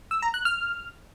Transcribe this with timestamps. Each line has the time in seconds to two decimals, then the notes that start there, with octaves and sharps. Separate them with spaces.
0.11 E6
0.22 A#5
0.34 F#6
0.45 F6